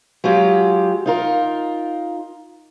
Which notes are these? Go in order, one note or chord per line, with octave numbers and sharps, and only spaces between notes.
F#3 G#3 F4 G4
D#4 F4 A#4